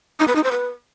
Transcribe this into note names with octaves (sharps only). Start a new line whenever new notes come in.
D#4
B4
D#4
C5
B4